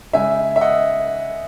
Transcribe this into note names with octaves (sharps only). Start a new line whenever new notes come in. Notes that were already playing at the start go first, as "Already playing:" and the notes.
C#3 G#3 E5 G#5
E5
D#5 F#5